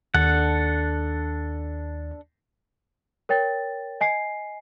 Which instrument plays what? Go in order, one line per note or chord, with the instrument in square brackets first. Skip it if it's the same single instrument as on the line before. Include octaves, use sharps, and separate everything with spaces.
[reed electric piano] D#2 [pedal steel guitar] D4 A4 F#5
[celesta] A#4 C#5 G5 A6
D#5 G#5 C7